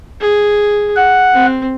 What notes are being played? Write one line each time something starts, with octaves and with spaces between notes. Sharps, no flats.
G#4
F#5
C4